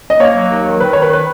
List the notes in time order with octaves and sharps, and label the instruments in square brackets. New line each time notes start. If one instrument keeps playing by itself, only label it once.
[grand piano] D#5
[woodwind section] A#3 [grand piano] C#5
[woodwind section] F#3
D#2
D#3
[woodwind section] D#3 [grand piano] B4
[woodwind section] D#3 [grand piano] C#5
[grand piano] B4
B4